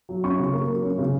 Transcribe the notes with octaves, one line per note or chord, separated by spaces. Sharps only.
F#3
C#4 C#6
C#3
A#3
F#3
C#4
C#3